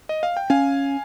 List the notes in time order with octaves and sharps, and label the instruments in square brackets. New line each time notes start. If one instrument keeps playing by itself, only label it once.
[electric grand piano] D#5
F5
G5
[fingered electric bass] C#4 [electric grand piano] F5 G#5